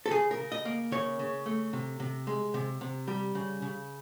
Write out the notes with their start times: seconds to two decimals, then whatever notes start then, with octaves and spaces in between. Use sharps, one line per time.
0.06 A4
0.11 C#3 G#4
0.31 A#4
0.38 C#3
0.52 D#5
0.65 A#3
0.92 C#3 C#5
1.19 C#3
1.46 A3
1.73 C3
2.00 C3
2.27 G#3
2.54 C3
2.81 C3
3.08 G3
3.35 C#3
3.62 C#3